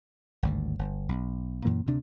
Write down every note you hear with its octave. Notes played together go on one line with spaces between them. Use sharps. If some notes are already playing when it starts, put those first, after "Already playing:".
G#1 D2 G2
G1
B1
F#2 A#2 E3 A#3
D2 C3 D4